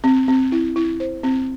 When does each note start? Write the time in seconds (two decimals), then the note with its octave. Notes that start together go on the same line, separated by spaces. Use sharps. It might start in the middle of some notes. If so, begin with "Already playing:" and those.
0.04 C4
0.28 C4
0.52 E4
0.76 E4
1.00 C5
1.23 C4